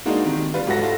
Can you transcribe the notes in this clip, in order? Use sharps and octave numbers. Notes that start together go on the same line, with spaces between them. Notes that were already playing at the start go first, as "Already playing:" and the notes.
G#3 A#3 D4 D#4 F#4
C3 D#3
G3 F4 B4
G#2 F#3 F#4 A4 F#5 A#6
E4 F4 A4